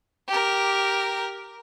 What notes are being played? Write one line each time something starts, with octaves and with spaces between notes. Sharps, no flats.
G4 A#4